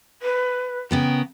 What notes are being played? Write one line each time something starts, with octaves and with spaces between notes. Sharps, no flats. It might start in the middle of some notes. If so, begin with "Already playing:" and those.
B4
C#3 B3 A#4 G5